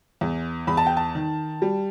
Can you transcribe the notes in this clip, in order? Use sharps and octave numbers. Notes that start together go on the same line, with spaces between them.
E2
E2 B5
A5
G5
A5
D#3
G3